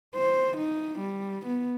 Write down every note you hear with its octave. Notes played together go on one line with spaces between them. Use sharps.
C5
D#4
G3
B3